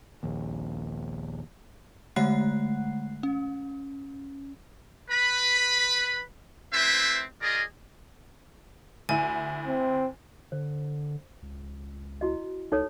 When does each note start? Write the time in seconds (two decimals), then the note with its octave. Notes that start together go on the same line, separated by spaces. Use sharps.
0.23 A#1 D#2
2.16 D3 G#3 A3 F#5 F#6 C7
3.23 C#4
5.10 B4 B5
6.73 A3 C4 E4 B4 C5 E5
7.42 F4 G#4 A#4 D5 D#5
9.09 D2 E4 G#5
9.67 C4
10.52 D3 C5
11.42 C#2
12.21 E4 F#4 D#5
12.72 C#2 D#4 A4 C#5